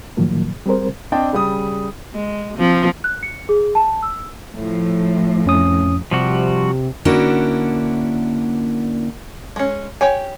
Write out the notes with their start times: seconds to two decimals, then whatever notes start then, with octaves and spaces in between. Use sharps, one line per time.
0.17 A2 D#3 F3 F#3 A#3
0.66 G3 C4 G#4 A#4 C5
1.12 C4 D4 D5 D#5 G5 A5
1.33 C#3 G3 D#6
2.14 G#3
2.57 F3 C4
3.04 F#6
3.23 C#7
3.49 G#4
3.75 A5
4.03 E6
4.55 A2 F3
5.46 F2 C#4 D#6
6.11 C3 F3 G3 F#4
7.05 D3 A#3 C#4 D4 E4 F#4
9.56 G#3 C#4
10.01 G4 C#5 G5 G#5